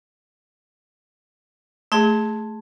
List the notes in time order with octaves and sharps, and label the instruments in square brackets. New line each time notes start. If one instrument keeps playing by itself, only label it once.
[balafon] A3 G#4 [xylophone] A5 C6 G#6